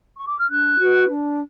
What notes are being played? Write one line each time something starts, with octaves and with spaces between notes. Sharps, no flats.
C#6
D6
F6
D4 F#6
F#4 B4
D4